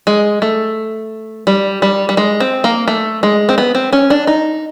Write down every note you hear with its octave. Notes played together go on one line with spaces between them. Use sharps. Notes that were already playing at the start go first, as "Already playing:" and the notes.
G#3
A3
G3
G3
G3
G#3
C4
A#3
A3
G#3
C4
B3
C4
C#4
D4
D#4